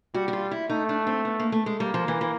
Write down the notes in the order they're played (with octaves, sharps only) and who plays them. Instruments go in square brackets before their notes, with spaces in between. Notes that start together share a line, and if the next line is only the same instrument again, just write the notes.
[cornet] G3 [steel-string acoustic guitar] F#4
[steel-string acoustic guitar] F#4
F4
E4
[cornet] A3 [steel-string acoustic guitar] D#4
[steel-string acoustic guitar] D4
C4
B3
A#3
A3
G#3
[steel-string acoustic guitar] G3 [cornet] A#3
[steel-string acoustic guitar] F3
E3
E3